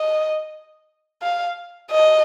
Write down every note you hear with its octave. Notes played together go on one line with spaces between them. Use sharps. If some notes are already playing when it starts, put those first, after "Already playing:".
Already playing: D#5
F5
D#5